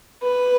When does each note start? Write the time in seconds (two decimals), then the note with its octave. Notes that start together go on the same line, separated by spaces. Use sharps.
0.23 B4